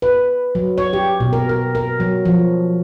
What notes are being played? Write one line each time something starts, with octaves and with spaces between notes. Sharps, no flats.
B4
F#3
C#5
G4
B2
A#4
A#4
A#4
F#3
F3